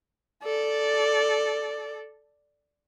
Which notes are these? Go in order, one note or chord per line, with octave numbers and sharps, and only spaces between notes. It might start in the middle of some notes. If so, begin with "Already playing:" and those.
A4 D5